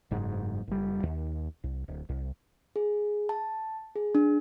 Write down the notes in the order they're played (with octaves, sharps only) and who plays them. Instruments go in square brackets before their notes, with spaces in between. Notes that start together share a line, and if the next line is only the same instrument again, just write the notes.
[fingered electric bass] F#1 G#2
F#1 G3
D#2
C2
D1
C2
[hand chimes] G#4
A5
G#4
D4